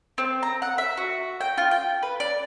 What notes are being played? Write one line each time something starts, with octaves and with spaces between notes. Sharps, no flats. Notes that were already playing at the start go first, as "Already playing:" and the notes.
C4
A#5
F#5
E5
F#4
G5
F4
G5
B4
D5